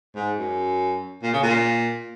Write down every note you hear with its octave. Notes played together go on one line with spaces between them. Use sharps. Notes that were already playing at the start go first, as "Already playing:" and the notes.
G#2
F#2
A#2
C#3
A#2